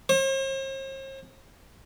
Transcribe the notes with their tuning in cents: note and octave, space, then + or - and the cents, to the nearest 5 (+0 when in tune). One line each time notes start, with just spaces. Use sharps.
C5 +45